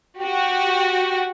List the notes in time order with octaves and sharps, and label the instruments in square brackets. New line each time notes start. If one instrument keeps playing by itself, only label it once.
[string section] F#4 G4